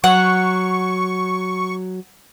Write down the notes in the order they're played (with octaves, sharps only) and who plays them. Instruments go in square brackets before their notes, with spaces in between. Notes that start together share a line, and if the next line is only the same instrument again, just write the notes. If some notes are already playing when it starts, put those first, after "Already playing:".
[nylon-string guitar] F#3 [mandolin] F#5 [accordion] C#6